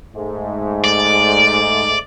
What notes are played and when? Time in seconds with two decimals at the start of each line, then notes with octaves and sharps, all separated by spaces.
0.15 G#2 A3
0.84 D5